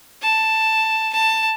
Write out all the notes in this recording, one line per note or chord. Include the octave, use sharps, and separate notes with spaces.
A5
A5